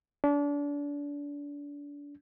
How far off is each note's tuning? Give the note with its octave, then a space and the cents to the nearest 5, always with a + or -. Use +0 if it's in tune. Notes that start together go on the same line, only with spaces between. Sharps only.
D4 -30